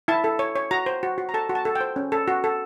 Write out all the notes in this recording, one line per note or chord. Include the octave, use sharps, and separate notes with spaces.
E4 A5
A4
C#5
C#5
F#4 A#5
C5
F#4
F#4
A#5
A4 A5
F#4
A5
A4
G5
C5
C#4
A4
F#4
A4